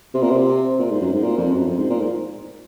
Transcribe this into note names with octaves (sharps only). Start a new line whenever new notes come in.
C3
A#2
C3
A#2
G#2
F#2
G#2
A#2
F2
F#2
F2
G#2
A#2
G#2